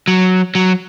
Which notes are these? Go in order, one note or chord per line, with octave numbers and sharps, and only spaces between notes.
F#3
F#3